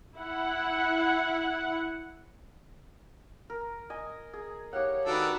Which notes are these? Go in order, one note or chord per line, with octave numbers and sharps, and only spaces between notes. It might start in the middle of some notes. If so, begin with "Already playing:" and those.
E4 F#5
A#4
D#5 G#5
G#4
G4 C#5 F5 F#5
D#3 D4 F#4 A4 B4